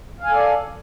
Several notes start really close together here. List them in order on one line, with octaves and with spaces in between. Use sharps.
F5 G#5 A4 D5